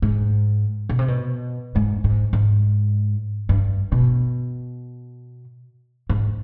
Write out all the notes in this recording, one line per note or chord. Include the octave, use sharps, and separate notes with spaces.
G#2
B2
C3
B2
G#2
G#2
G#2
G2
B2
G#2